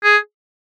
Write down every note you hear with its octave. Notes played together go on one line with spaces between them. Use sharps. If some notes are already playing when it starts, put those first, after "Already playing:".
G#4